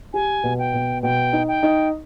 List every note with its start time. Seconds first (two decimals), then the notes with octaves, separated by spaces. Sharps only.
0.14 G4 G#5
0.44 B2
0.59 G5
0.74 B2
1.03 B2 G5
1.33 D#4
1.48 G5
1.63 D#4